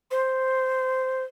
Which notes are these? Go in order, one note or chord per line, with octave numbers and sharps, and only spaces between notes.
C5